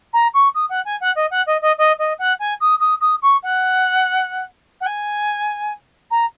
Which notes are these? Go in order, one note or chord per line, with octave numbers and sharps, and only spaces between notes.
A#5
C#6
D#6
F#5
G#5
F#5
D#5
F#5
D#5
D#5
D#5
D#5
F#5
G#5
D#6
D#6
D#6
C#6
F#5
F#5
G#5
A#5